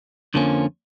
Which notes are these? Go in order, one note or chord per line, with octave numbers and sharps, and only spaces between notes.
F2 D3 F3 A#3 C#4